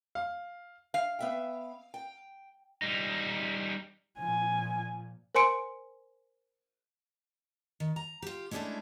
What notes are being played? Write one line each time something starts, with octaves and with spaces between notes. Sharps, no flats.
F5
F5
B3 E5 G5
G5
G3 D#4
A#2 F3 G#5
A#4 C5 G#5 C6 C#7 D7
D#3
A#5
F4 G4
G#3 A3 C#4 D4 E4 A4